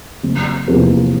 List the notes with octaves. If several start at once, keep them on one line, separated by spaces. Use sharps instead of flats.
F#1
E2 C3 F3 A#3